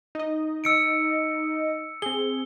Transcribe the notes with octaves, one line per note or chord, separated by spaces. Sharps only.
D#4 D#5
E6 C#7 D7
C4 G#4 G7